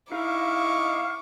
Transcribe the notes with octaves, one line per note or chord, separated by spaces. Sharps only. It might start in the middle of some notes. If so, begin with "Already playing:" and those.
D#4 E4 F5 C#6 D6